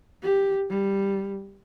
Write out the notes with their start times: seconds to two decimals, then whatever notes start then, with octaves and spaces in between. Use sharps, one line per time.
0.23 G4
0.70 G3